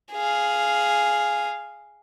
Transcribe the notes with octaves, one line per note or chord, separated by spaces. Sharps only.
G#4 F5